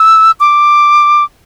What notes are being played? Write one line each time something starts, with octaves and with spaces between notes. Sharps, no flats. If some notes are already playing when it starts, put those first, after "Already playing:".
Already playing: E6
D6